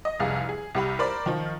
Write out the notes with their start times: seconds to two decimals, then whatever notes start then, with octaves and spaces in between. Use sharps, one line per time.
0.05 D#5
0.20 F1 C2 G#4 F5
0.49 G#4
0.75 C2 G4 B5
0.99 A#4 C5 D5 B5
1.26 D#3 F3 F4